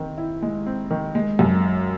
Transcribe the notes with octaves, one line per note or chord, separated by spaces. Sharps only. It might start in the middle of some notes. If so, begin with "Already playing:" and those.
Already playing: D#3 C4
E4
G#3
C4
D#3
G#3
F#2